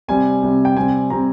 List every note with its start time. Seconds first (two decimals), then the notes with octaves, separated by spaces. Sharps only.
0.08 C3 G3 C4 G#5
0.43 C3 G3 C4
0.65 G5
0.77 C3 G3 C4 G#5
1.10 C3 G3 C4 A#5